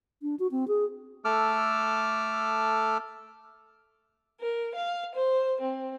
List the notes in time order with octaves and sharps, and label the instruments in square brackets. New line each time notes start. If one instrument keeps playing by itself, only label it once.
[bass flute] D4
F#4
C4
G#4
[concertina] A3 A4 D6 E6 F6
[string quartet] A#4
F5
C5
C4